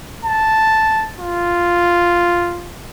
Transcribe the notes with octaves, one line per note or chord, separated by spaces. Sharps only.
A5
F4